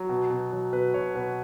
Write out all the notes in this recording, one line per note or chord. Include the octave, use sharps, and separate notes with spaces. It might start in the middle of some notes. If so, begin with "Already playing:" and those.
Already playing: F#3
B2
B2
F#3
B2 B4
B2 C#5
B2 B4